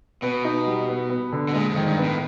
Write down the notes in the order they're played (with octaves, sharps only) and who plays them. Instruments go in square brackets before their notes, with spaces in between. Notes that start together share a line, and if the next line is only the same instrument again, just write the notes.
[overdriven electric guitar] B2 [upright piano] B3
[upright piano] D#4
G3
B3
B3
D3
[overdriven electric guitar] B2
[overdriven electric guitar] A#2 [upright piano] G#3
[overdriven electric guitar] F2
[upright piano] D#3
[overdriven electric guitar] G2
[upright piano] B3
[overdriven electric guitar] A2